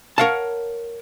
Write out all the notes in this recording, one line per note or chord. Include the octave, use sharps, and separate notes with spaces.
A#4 C#5 F5 F#5 A5